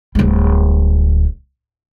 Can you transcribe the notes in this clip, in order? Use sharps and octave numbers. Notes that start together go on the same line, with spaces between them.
D1 G3